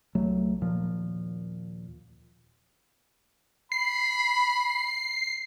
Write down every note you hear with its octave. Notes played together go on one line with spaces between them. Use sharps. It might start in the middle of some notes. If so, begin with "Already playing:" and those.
C2 F#3 A3
D#2 A#2 F3
B5 C7